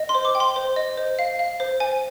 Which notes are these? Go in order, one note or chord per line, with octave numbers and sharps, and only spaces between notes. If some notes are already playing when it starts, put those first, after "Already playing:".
Already playing: D#5
C6
C5
D6
G5
C6
C5
D#5
C5
F5
F5
C5
C5 G#5